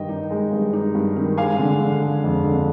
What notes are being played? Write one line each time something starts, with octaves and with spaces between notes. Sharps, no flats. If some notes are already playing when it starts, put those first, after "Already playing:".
Already playing: G2 D#3 D#5 G5
D#4
G#3
G2
D#4
G2
D#3
G#3 F5 G#5
D3
D3
G#3
F2
D3